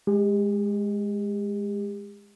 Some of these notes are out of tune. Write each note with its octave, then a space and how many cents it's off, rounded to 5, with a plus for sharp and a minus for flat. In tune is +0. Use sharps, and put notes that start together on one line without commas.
G#3 +0 G4 +40